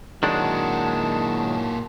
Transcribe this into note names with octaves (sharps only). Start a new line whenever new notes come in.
A#2 D#3 F#3 G#3 D4 E4 F#4 A5